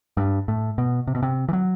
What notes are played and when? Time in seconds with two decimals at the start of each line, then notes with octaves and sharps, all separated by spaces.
0.17 G2
0.48 A2
0.78 B2
1.07 C3
1.15 B2
1.23 C3
1.49 E3
1.53 F#3